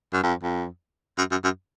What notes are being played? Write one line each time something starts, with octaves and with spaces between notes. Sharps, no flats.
F#2
F2
F2
F#2
F#2
F#2